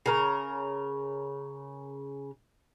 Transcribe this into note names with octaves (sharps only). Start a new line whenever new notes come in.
C#3 A#4